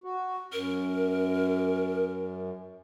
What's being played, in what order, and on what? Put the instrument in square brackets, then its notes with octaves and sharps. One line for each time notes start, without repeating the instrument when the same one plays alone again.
[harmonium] F#4
[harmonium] F#2 [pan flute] A#4